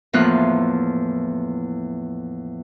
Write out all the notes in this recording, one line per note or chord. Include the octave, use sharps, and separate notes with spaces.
E2 A2 F3 A#3 F4 F#6